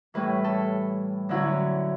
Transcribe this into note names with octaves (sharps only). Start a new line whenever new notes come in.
A2 E3 G3 C#4 B4
A4
D3 F#3 C#4 E4